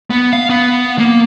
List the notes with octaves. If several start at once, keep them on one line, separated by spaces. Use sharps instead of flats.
B3
F5
B3
A#3